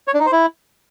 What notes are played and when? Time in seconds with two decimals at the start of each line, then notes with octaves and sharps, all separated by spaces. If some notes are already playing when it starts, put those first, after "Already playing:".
0.08 C#5
0.14 D4
0.20 D#4
0.26 C5
0.32 E4